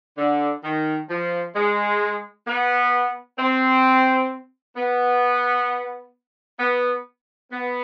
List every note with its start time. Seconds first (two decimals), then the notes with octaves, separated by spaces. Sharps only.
0.18 D3
0.64 D#3
1.10 F3
1.55 G#3
2.47 B3
3.39 C4
4.76 B3
6.59 B3
7.52 B3